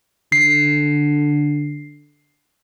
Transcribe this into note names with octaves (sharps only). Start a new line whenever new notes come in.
D3 C7